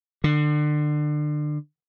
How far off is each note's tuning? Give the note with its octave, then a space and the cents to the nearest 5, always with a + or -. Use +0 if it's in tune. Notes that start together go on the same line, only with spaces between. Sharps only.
D3 +30